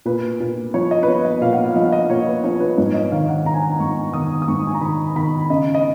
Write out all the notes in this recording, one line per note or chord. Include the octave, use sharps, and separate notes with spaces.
A#2 B4
A#2
F3 C#5
D#5
B4
F3 C#5
D#5
A#2 F5
F#5
F5
F3 D#5
F5
D#5
A#2 C#5
B4
F3 C#5
B4
G#2 C#5
D#5
D#3 F5
F#5
D#3 A#5
G#5
A#5
G#2 C#6
D#3 D#6
D#6
G#2 C#6
G#5
A#5
D#3 B5
D#3 B5
C#3 D#5
D#5